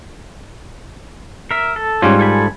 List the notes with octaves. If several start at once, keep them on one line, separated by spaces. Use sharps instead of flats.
A#4 E5
A4
G#2 G3 C#4 F4
A4 G#5 B5